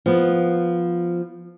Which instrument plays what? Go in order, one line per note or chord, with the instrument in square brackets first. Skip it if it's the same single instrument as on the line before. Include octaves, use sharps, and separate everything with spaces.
[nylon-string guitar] F3 B3